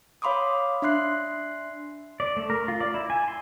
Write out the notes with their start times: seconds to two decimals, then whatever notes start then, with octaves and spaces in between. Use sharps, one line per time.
0.22 C#5 F5 B5 C6 D6 D#6
0.82 D4 E5 C6 F#6 C7
2.20 D5
2.37 A3
2.50 A#4
2.68 F4
2.81 D5
2.94 E4
3.10 G#5
3.28 C6